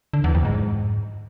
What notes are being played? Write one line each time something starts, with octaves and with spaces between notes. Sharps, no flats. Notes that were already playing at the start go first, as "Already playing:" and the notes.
D3
E2
F2
G#2